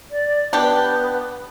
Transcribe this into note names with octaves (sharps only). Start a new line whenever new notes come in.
D5
B3 D4 G4